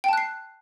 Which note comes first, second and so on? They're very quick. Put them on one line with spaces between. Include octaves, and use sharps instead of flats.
G5 A5 F#6 C7